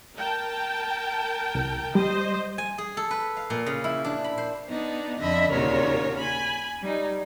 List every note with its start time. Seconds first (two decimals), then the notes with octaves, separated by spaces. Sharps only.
0.16 A#4 G5 A5
1.55 C2
1.95 G3 C5 D#5
2.58 G#5
2.78 G#4
2.97 A4
3.11 B4
3.37 F5
3.50 A#2
3.66 C#3
3.84 E4
4.04 D4
4.24 B5
4.38 C5
4.69 B3 D4 D#4
5.19 F2 D3 D#5 E5 B5
5.50 D#2 A#2 C#3 F#4 A#4 C#5
6.19 G#5 B5
6.81 G3 D#4